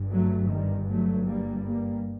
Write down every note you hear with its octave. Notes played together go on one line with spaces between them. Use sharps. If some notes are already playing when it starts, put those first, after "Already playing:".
Already playing: G1 G2
F#3 A3
D#3 G3
F#3 A3
G3 A#3
G3 A#3